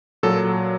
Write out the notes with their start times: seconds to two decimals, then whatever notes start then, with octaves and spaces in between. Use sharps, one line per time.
0.23 A#2 F#3 A4